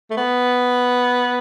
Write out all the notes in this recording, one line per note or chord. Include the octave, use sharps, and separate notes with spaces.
A3
B3